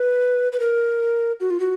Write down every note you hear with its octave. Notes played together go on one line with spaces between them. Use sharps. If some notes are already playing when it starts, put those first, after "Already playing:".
Already playing: B4
B4
A#4
F#4
F4
F#4